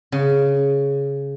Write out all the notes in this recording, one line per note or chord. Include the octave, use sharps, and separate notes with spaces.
C#3